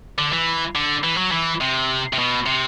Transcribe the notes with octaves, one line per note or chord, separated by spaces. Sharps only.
D3
E3
D3
E3
F#3
E3
C3
C3
B2
C3